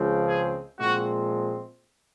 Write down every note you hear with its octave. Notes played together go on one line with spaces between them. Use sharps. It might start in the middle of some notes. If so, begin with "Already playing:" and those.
Already playing: C#2 C#3 F3 G#3 C4
G#4
A#2 F3 G#3 C4 F#4